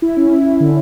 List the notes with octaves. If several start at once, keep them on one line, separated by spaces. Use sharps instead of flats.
E4
C#4
E4
E4
D3